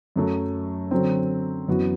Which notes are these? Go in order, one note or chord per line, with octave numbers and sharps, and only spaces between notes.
F#2 F#3 A3
D3 F#3 C4
F#2 E3 B3 F#4